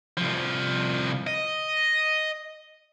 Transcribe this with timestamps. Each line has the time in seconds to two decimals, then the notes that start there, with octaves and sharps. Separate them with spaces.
0.17 C2 F3
1.27 D#5